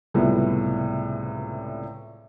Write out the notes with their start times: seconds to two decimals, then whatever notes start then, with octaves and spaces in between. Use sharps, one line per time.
0.14 C#2 A2 C3 F3 G3 B3